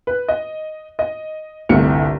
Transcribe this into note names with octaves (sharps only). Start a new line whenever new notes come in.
B4
D#5
D#5
G1 C2 A3 C#7